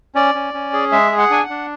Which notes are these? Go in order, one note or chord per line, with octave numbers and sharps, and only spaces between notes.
C#4 D5
C#4
C#4
G#4
G#3 E5
G#4
F#5
D4 G#5
F#5
D4